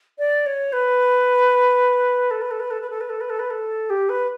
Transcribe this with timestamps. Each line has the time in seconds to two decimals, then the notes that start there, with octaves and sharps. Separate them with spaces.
0.18 D5
0.46 C#5
0.72 B4
2.30 A4
2.41 B4
2.51 A4
2.60 B4
2.70 A4
2.81 B4
2.90 A4
3.00 B4
3.09 A4
3.20 B4
3.29 A4
3.39 B4
3.50 A4
3.90 G4
4.09 B4